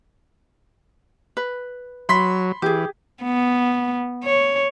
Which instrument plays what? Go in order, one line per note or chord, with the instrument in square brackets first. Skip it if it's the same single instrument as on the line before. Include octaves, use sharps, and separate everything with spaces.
[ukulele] B4
[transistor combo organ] F#3 [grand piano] B5 C6 B6
[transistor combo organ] E3 [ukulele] G4 G#4
[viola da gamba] B3
C#5